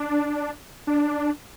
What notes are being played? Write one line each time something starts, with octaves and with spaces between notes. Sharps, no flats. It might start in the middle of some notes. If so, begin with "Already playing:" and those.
Already playing: D4
D4